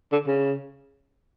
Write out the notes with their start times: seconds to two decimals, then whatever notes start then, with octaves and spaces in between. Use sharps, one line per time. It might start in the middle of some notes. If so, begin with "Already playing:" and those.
0.12 D3
0.27 C#3